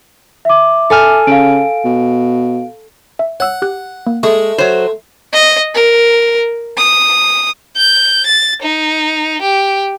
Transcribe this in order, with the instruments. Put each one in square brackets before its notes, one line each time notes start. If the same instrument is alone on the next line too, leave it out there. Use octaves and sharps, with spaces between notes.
[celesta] E5 D6
[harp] A4 G#5 F6
[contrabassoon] C#3 [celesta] F5 D7
[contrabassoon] B2
[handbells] E5
[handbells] C#5 E6 [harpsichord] F#5
[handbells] G4 F#6
A#3
[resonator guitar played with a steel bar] G#3 [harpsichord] A3 [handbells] C#6
[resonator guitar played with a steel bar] F#3 C5 [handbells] C#5
[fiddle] D#5
A#4
D#6
[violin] G6
A6
D#4
G4